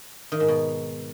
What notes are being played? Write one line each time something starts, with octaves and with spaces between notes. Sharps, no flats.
D#3
G#2
B2